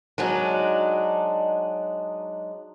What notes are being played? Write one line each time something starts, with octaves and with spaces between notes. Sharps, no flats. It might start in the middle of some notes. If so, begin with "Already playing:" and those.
F#3 G#3 D4 D#4